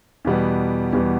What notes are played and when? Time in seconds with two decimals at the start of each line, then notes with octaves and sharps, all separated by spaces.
0.25 E2 B2 G3 B3
0.93 E2 B2 G3 B3